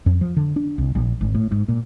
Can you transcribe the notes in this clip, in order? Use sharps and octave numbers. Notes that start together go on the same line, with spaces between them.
F2
F3
D3
D4
C2
A#1
G#1
A2
G#2
A#2